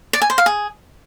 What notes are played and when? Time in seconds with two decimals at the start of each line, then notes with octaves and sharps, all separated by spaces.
0.13 D5
0.22 G#5
0.30 C5
0.38 F5
0.46 G#4